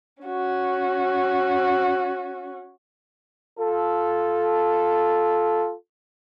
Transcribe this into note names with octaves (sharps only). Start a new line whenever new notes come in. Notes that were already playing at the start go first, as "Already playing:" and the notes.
C#4 F#4
F4 A4